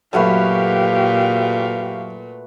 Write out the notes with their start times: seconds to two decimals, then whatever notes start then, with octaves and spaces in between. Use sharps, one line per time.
0.13 F#2 A#2 A3 F#4 G4 B4 F5